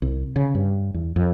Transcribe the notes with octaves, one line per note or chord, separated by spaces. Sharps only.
C2
C#3
G2
E2
F2